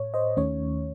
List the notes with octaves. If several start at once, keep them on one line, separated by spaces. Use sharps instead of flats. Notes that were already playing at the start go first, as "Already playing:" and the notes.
Already playing: A2 C#5
C5 D#5
D#2 D#3 A3 C#4 C#5